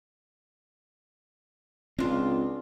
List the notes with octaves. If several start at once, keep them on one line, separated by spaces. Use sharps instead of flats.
C#2 C4 D4 F4